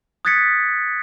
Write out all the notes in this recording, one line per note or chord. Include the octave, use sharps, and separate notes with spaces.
D#6 F#6 G#6 A6 B6 C#7